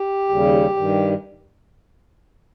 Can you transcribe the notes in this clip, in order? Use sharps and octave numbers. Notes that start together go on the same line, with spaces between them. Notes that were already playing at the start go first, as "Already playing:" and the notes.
Already playing: G4
D#2 C#3 G3
G2 D#3 G3